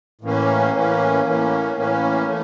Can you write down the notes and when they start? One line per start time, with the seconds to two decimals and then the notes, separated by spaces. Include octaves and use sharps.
0.21 A2 E3 A#3 C#4
0.73 A2 E3 A#3 C#4
1.23 A2 E3 A#3 C#4
1.75 A2 E3 A#3 C#4
2.26 E3 A3